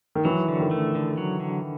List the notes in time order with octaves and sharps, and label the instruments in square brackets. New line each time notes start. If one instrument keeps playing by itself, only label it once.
[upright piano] D#3
[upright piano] E3 [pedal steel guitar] F#3
[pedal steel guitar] D3
[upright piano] D#3
[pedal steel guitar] A3
D3
F#3
D3